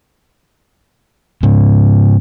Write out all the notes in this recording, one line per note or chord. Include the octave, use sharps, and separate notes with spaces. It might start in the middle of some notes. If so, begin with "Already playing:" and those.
G#2 C#3